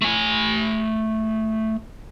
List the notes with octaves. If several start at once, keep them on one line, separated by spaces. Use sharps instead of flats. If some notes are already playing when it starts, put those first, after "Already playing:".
A3 G#5